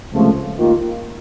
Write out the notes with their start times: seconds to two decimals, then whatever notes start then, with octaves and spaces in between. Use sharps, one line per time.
0.12 C#2 C3 F3 A3
0.57 D#2 D#3 A#3 F4